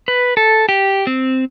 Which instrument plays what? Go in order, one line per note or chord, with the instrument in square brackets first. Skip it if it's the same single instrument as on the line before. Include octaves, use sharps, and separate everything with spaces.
[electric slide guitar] B4
A4
G4
C4